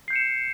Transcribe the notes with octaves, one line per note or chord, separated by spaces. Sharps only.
G6 C7 C#7 E7